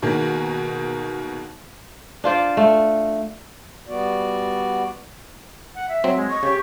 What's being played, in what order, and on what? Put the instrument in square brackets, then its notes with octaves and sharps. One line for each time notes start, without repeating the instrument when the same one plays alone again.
[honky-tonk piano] B2 D#3 A#3 G#4
[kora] D4 F4 C5 D5
A3
[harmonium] G3 B3 F#4 D5
[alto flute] F#5
E5
[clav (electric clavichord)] F#3 C4
[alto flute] G#3
[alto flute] D#5 [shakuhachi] C#6
[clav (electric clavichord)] C#3 [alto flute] G4